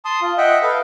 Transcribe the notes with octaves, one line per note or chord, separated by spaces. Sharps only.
A5 C6 D#6
F4
D#5 E5 F#5 G5
A4 B4 F5